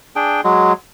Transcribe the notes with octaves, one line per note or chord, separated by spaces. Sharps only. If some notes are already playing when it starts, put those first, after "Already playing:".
D4 G#4 G5
F#3 G#3